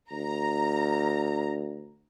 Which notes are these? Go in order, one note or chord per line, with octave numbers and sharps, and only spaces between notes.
D2 A#5